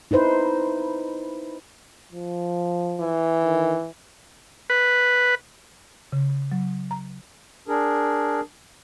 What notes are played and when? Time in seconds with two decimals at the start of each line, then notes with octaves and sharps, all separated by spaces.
0.11 D#4 E4 B4 C5
2.12 F3
3.00 E3
3.42 D#3
4.70 B4
6.12 C#3
6.52 F#3
6.91 A#5
7.68 D4 G#4 A#4